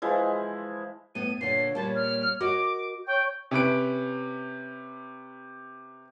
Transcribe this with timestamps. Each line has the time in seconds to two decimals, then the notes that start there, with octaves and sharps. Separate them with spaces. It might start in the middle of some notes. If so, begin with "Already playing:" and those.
0.02 E3 F3 G#3 E4
1.15 A2 B3 D#7
1.41 A#2 D3 C#5 C7
1.75 A#2 G3 A#3 A5
1.95 F6
2.40 F#4 A#4 D#5 D6
3.07 C#5 G5 C#6 G6
3.51 C3 C#4 B4 D7